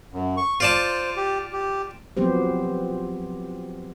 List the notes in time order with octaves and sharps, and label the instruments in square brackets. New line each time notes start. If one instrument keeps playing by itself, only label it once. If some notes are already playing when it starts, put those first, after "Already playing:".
[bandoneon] F#2
C#6
[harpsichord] F4 D5 A5 [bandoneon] C5
[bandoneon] G4
G4
[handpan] F3 F#3 B3 C4 G4 C5